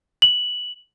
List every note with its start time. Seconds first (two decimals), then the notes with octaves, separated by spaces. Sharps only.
0.22 F#7